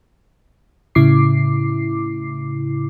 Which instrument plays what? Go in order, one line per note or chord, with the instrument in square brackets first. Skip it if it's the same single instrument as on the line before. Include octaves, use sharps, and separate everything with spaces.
[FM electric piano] A2 C#3 E4 D6 C7